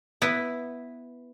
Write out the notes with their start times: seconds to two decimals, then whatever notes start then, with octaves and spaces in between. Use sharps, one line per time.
0.22 B3 E4 B4